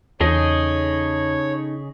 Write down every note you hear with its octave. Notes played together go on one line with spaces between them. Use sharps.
E2 C#3 D#4 G#4 A4 C#5 D#5